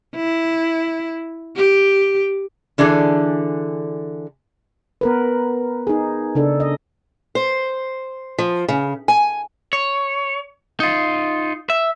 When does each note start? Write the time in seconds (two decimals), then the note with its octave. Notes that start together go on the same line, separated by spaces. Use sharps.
0.15 E4
1.57 G4
2.78 D3 E3 D4 G#4 A4
5.01 B3 A#4 B4
5.87 D#4 G#4
6.35 C#3 D4 A4
6.60 D#5
7.35 C5
8.38 F3
8.68 C#3
9.08 G#5
9.73 C#5
10.80 D#4 F4
11.70 E5